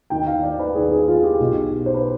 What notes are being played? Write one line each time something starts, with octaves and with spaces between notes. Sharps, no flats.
D#2 D#3 G5
F5
D5
B4
D#2 D#3 G#4
G#4
F4
G4
B1 B2
C5
B4